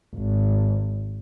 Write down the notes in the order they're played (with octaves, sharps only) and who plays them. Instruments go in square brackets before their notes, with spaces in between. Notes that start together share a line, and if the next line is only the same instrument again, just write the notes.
[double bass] G#1